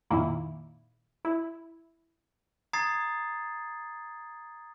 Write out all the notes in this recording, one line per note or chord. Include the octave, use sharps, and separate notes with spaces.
F2 A#2 D#3 A#3 D#4 E4
E4
A#5 D#6 G#6 A6 C7